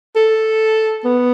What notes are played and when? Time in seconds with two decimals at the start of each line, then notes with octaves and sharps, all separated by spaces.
0.16 A4
1.05 B3